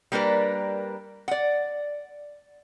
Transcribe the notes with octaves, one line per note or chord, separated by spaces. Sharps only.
G3 A#3 D4 A#4 B4
D5 F#5